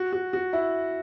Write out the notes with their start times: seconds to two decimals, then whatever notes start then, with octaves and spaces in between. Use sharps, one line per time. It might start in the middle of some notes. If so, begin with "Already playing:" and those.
Already playing: F#4
0.13 F#4
0.33 F#4
0.53 E4